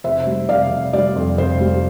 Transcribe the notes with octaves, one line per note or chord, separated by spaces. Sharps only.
F1 C5 E5
G3
F1 D5 F5
F1
G3 D5
F2
F1 C5
G3